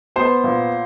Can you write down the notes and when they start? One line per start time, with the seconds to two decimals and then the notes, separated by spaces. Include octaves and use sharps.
0.16 B3 C5
0.44 A#2